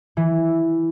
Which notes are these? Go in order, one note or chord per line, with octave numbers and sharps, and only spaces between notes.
E3